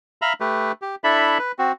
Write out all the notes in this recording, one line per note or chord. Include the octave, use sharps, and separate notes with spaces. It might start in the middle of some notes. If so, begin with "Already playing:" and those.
E5 F5 A#5 B5
A3 G4 B4
G4
D4 E4 A4 E5 B5
B4
C4 F#4